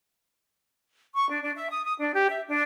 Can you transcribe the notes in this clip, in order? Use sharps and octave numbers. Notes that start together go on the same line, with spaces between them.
C#6
D4
D4
E5
D#6
D#6
D4
G4
E5
D4